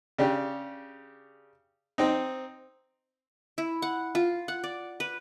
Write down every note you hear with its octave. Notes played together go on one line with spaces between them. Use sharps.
C#3 D4 G4
C4 D#4
E4
F#5
F4
F#5
D5
B4